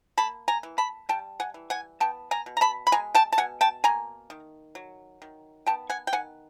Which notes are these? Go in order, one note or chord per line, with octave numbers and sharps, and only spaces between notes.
A#3 A5 B5
G#5 A#5
E3
A5 B5
G3 G5 A5
F#5 G#5
E3
F#5 G#5
B3 G5 A5
G#5 A#5
B2
A#5
A5 B5
B5
G#3 G#5 A#5
G5 A5
A5
B2 F#5 G#5
G5 A5
A#3 G#5 A#5
D#3
F#3
D#3
B3 G5 A5
F#5 G#5
G5
D#3 F#5 G#5